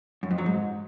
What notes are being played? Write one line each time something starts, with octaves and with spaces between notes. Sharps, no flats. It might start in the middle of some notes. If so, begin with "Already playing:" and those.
F#2
F2
F#3
G#2